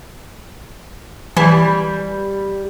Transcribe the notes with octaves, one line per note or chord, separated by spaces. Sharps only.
E3 G3